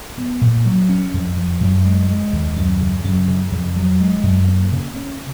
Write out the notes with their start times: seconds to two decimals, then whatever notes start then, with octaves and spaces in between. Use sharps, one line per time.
0.18 B3
0.41 A#2
0.66 F#3
0.89 C#4
1.14 F2
1.37 F3
1.61 F#2
1.85 G#3
2.09 G#3
2.33 D#2
2.56 F#2
2.81 C#3
3.04 F#2
3.28 C#3
3.52 F2
3.76 F#3
4.01 G#3
4.23 F#2
4.48 A#3
4.72 C#3
4.96 C#4